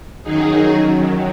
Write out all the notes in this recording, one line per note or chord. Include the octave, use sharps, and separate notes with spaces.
F#2 D#3 F#3 D#4 G#4